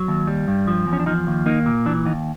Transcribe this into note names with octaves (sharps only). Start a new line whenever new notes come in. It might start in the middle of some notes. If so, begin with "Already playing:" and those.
Already playing: F#3
D#2
G3
G2
F3
E2
C#4
D4
F3 D#4
D#2
A#3 D#4
A#2
E3 D4
D#2 D#4